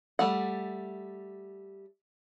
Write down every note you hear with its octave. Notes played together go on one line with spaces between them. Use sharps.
G3 A3 F#5